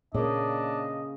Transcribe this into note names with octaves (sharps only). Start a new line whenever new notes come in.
A#2 C#3 A#3 D4 D#5